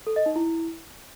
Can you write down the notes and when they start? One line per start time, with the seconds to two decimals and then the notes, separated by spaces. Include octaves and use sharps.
0.07 A4
0.16 D#5
0.26 D#4
0.36 E4